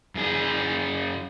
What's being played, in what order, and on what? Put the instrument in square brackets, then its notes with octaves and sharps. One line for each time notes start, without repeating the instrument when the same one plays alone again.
[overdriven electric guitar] F#2 G#4